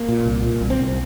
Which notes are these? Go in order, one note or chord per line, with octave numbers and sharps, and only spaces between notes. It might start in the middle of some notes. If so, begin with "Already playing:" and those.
Already playing: A#3
A#2
C2
A#2
C2
C4
C2